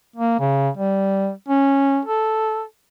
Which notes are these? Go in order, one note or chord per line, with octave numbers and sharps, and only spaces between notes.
A#3
C#3
G3
C#4
A4